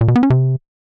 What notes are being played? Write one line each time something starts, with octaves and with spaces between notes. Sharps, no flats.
A#2
B2
B3
C#4
C3